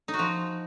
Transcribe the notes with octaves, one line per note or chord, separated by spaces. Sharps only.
D#4
F#4
F3